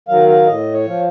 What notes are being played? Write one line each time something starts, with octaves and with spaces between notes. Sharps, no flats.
D#3 F#3 F5
F5
A2 D#5
C#5
F3